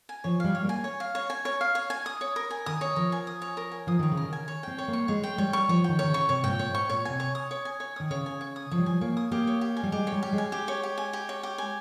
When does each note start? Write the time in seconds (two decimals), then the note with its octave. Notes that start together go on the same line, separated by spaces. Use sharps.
0.09 G#5
0.24 F3 C#5
0.40 G3 F5
0.55 C#5
0.64 A#3 G#5
0.84 C#5
1.00 F5
1.15 C#5
1.30 G#5
1.45 C#5
1.61 F5
1.75 C#5
1.90 G#5
2.06 D#6
2.21 C#5
2.36 A#4
2.51 G#5
2.66 D#3 D#6
2.81 C#5
2.96 F3 A#4
3.12 G#5
3.27 D#6
3.42 C#5
3.57 A#4
3.71 G#5
3.87 F3 D#6
3.99 D#3 C#5
4.12 C#3
4.17 A#4
4.24 D#3
4.33 G#5
4.48 C#5
4.63 C4 G5
4.78 C#5
4.88 A#3
4.93 C#6
5.08 G#3 C#5
5.23 G5
5.38 G3 C#5
5.53 C#6
5.68 F3 C#5
5.84 D#3 G5
5.99 C#5
6.04 D#3
6.09 C#3
6.14 C#6
6.29 C3 C#5
6.43 G#2 G5
6.50 A#2
6.59 C#5
6.70 G#2 C#6
6.89 A#2 C#5
7.05 C3 G#5
7.20 C#5
7.35 D#6
7.51 C#5
7.65 G#5
7.80 C#5
7.96 D#3 D#6
8.10 C#3 C#5
8.26 G#5
8.41 C#5
8.56 D#6
8.71 F3 C#5
8.79 G3
8.86 F3 G#5
9.01 A#3 C#5
9.17 D#6
9.31 A#3 G4
9.47 C#5
9.61 G4
9.77 G#5
9.83 G3
9.92 G#3 G4
10.07 C#5
10.12 G3
10.23 G4
10.33 G#3
10.38 G#5
10.52 G4
10.68 C#5
10.83 G4
10.98 G#5
11.13 G4
11.29 C#5
11.43 G4
11.58 G#5